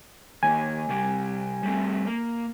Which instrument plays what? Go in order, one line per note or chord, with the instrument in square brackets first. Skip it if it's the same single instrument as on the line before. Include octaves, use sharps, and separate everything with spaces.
[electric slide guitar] D#3 A#3 [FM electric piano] G#5
[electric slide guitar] C3 G3 G4
G3 A3 C4
A#3